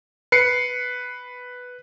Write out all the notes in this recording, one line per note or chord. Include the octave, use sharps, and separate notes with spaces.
B4 C7 C#7